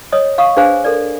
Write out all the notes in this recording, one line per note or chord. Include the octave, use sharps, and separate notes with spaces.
C#5 D#5 D#6
F5 C#6 D#6
D4 G#4 B4 C5 F5 G#5
A4 A#4 D5